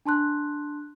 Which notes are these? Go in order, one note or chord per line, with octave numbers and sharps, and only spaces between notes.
D4 A5 C6 F#6